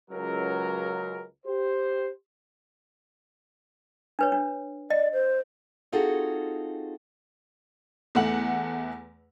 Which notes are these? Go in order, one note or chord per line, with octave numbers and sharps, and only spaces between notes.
C#2 F#3 A#4
G4 C5
D4 B4 C#5
D4
D5 D#5
C5
C4 D#4 F4 F#4 G#4 A4
E2 A3 F#5 F#7